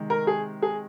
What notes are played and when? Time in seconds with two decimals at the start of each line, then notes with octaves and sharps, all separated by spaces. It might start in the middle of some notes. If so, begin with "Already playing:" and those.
Already playing: C3 D#3 G#3
0.10 A#4
0.27 G#4
0.62 G#4